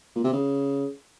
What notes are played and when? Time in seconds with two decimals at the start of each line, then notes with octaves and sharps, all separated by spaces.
0.15 A#2
0.24 C3
0.33 C#3